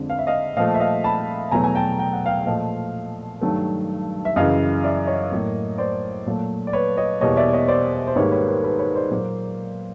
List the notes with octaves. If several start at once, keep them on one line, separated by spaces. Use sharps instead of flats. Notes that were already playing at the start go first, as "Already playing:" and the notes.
Already playing: F2 D3 F3 G#3
F5
E5
D#5 F5
A#2 F3 A3 D#5 F5
E5
D#5 F5
A5 B5
E2 B2 F#3 A3 G#5 A#5
G#5
G5 A5
G5
F#5
F5 G5
A#2 F3 A3 D#5 F5
G2 D#3 F#3 A3
E5
F#2 C#3 E3 D#5 F5
D5 E5
C#5 D#5
A2 F#3 A#3
C5 D5
A#2 F#3 A3
D5
B4 C#5
C#5 D#5
E2 B2 G3 A#3 C#5 D#5
D5 E5
C#5 D#5
C5 D5
C5
G#2 D#3 G3 A#3 B4 C#5
B4 C#5
A#4 C5
A4 B4
B4 C#5
C5 D5
A#2 F#3 A#3